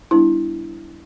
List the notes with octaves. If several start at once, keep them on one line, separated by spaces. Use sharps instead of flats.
G3 B3 D4 E4